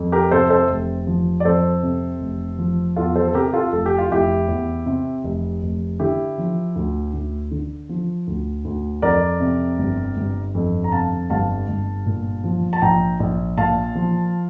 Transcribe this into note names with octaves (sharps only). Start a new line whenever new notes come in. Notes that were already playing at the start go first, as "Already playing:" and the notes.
Already playing: F2
G4 A#4
C3 A4 C5
A4 C5
F1
F3
D5
F2 A4 C5
C3
F1
F3
E2 F4 A4
A4 C5
A4
C3 G4 A#4
G4
F4 A4
F1 A4
G4
F4
F1 E4 G4
E2
C3
F1
F1
D3 E4 G4
F3
D2
D2
D3
F3
D2
D2
F2 A#4 D5
C3
G1
G1
F2
A#5
C3 F5 A5
G1 F5 A5
G1
A#2
F3
A5
A#1 G5 A#5
A#1
A#2 F5 A5
F3